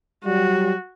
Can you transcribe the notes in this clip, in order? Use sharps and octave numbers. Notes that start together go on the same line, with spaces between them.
F#3 G3 F#4